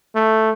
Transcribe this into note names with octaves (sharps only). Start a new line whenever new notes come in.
A3